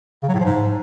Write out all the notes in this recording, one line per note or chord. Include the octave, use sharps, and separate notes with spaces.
C#3
F#3
A2
F3
G#2